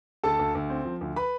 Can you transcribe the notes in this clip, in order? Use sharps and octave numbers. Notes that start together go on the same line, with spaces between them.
D2 A4 A5
D2
D2
C4
F3
D2
B4 B5